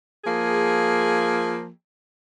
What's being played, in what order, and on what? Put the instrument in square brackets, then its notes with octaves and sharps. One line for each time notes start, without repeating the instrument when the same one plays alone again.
[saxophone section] F3 A#3 G#4